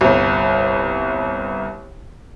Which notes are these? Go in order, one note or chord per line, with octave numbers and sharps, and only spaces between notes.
G1 C2